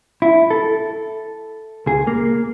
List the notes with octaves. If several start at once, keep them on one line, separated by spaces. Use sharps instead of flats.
E4
A4
C#2 G#4
A#3